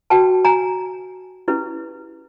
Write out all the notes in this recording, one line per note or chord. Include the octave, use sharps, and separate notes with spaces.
F#4 B4 G5 A5
G#5 A#5
C#4 E4 G4 B4